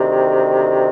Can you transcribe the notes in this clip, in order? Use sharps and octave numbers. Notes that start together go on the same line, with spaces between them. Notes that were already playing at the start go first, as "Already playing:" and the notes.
Already playing: D2 C3 D#3